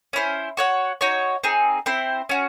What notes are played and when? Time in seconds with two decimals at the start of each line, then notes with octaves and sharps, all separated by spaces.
0.13 C#4 E4 C5
0.57 F#4 C#5 F#5
1.01 D#4 F#4 C#5
1.44 C4 D#4 G#4
1.86 C4 E4 C5
2.29 C#4 F#4